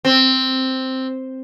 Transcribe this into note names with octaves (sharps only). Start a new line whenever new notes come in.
C4